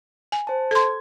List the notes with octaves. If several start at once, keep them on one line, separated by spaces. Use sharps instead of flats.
G#5
C5 A5
A4 C6 G#6